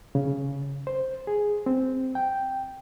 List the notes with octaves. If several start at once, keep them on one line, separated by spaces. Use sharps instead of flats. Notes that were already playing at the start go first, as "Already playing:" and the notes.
C#3
C5
G#4
C4
G5